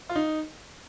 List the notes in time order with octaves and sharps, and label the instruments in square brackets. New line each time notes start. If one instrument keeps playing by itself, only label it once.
[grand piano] F4
D#4